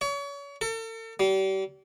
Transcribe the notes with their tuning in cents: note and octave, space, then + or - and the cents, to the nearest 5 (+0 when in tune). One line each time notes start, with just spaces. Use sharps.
C#5 +35
A4 +40
G3 -35